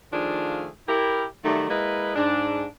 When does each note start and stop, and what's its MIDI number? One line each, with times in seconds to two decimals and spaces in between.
0.12 0.68 51
0.12 0.68 53
0.12 0.68 57
0.12 0.68 62
0.12 0.68 65
0.12 0.68 68
0.88 1.25 64
0.88 1.25 67
0.88 1.25 70
1.44 1.66 51
1.44 1.66 54
1.44 1.66 55
1.44 1.66 57
1.70 2.15 56
1.70 2.15 58
1.70 2.15 64
1.70 2.15 71
1.70 2.15 75
2.16 2.65 44
2.16 2.65 62